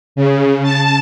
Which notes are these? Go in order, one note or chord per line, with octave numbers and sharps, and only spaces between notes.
C#3
A5